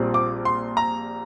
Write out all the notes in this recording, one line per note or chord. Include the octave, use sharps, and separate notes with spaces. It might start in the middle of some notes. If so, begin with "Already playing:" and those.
Already playing: A#1 A#2 G3 C4
D6
C6
A#5